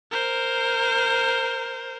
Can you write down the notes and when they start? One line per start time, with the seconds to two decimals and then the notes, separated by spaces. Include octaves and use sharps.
0.11 A#4 C5